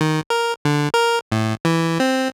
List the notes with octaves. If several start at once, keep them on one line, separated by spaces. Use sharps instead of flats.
D#3
A#4
D3
A#4
A2
E3
C4